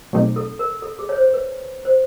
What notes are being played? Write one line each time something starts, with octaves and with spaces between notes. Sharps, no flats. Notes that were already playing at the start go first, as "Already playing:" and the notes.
B2 F#3 A3 C4 D#4 G#4
A4
A#4
A4
G#4
C#5
C5
B4
C5